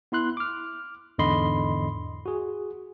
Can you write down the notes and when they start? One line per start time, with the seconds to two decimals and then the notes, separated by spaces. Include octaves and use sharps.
0.12 B3 E4 C6 F#6
0.37 D6 F6
1.18 E2 G#2 D3 D#5 B5 C6
2.26 F#4 G#4